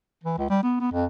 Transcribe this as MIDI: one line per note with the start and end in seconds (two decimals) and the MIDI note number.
0.24 0.38 52
0.38 0.47 37
0.50 0.60 55
0.63 0.76 59
0.80 0.88 59
0.92 1.06 41